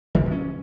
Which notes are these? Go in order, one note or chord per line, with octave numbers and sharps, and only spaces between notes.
D#3
G3
F3
C#4